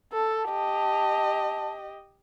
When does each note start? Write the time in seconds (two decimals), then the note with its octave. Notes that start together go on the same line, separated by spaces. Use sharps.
0.13 A4 A5
0.49 G4 D#5